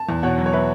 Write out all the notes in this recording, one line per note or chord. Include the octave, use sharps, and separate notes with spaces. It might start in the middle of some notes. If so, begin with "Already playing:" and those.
Already playing: A5
E2
B2 C#5 F#5
F#3
C#5
F#3 B4 E5